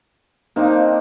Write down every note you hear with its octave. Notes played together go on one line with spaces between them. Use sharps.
A#3 C4 D4 D#4